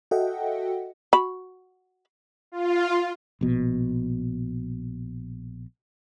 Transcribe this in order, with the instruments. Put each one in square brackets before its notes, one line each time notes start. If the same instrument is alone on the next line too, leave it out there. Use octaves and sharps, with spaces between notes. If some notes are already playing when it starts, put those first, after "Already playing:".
[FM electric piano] F#4 A4 D#5 E5 F#5 G5
[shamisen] F#4 B5
[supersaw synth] F4
[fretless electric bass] A#1 B2